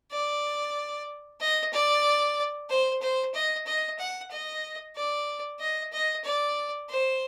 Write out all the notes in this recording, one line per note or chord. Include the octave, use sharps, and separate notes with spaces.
D5
D#5
D5
C5
C5
D#5
D#5
F#5
D#5
D5
D#5
D#5
D5
C5